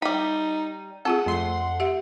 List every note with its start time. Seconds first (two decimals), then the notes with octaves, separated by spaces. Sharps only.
0.02 G3 D#4 B5
1.05 C4 F4 G#4 A4 F#5
1.26 F2 A3 C6
1.80 G4 E5 F#5